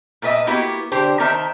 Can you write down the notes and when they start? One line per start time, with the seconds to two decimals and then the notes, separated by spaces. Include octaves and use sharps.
0.22 A#2 A4 B4 D#5 E5
0.47 A#3 B3 E4 F#4 G4
0.92 D3 D4 G4 C5
1.20 D#3 D#4 A#4 C5 E5 A5